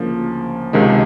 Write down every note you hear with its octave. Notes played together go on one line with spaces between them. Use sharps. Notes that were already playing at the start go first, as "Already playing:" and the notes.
Already playing: D2 C#3 F3 A#3
C#2 C3 D#3 G#3